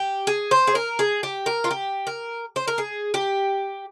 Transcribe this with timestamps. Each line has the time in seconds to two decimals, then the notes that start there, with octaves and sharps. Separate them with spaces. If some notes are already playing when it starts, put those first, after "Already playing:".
Already playing: G4
0.27 G#4
0.51 C5
0.67 G#4
0.75 A#4
0.99 G#4
1.23 G4
1.46 A#4
1.64 F4
1.71 G4
2.07 A#4
2.56 C5
2.68 A#4
2.78 G#4
3.14 G4